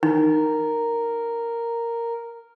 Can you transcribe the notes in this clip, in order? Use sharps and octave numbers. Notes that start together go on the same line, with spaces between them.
D#4 A#4